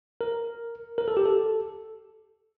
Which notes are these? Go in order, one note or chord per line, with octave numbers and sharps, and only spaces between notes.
A#4
A#4
A4
G4
A4